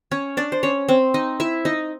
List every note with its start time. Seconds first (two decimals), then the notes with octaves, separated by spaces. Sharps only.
0.11 C#4 C#5
0.37 D4 D5
0.52 C5
0.63 C#4 C#5
0.88 C4 C5
1.14 D#4 D#5
1.40 E4 E5
1.65 D#4 D#5